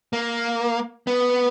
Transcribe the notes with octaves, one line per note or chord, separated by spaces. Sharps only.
A#3
B3